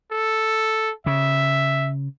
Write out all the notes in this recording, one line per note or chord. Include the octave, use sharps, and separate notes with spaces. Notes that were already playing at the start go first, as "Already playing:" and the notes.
A4
C#3 E5